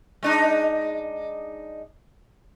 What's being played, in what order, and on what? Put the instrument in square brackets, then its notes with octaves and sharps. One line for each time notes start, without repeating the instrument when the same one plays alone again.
[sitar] G#3 D4 D#4